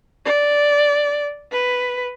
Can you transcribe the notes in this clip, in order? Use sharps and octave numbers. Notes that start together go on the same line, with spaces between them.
D5
B4